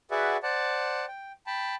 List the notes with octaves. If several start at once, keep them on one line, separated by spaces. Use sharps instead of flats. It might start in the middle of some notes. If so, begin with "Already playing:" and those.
F#4 G#4 B4 D5 E5 F#5
C5 D5 F#5 A5
G5
G5 A5 B5